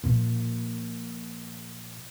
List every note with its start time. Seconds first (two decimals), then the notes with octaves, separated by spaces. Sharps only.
0.04 A#2 F3